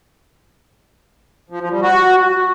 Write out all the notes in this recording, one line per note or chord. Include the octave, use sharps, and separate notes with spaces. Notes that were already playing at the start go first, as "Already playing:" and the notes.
F3
F3
G3
F#4